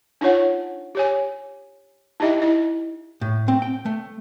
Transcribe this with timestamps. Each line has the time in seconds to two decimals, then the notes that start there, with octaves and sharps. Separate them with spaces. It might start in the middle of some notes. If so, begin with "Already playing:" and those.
0.21 D4 D#4 F4 C#5 F#5
0.95 G4 C#5 G#5
2.20 D#4 E4 G4 D#5 E5 G5
2.42 E4 D#5
3.21 A2
3.48 C4
3.62 G5
3.86 A3